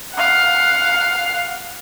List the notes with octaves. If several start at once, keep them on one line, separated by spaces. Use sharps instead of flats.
F5 F#5